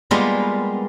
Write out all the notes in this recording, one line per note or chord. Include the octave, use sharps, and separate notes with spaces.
G3 G#3 A#3 B3 F4